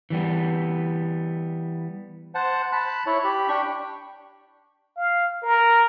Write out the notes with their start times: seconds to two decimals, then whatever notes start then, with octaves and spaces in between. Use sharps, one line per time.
0.10 E3 G3 B3
2.35 C5 F#5 A5
2.72 A5 B5 F#6
3.06 E4 C#5
3.24 G4 B5
3.49 D4 G5 C#6
4.97 F5
5.42 A#4